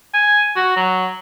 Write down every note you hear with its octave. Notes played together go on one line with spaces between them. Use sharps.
G#5
F#4
F#3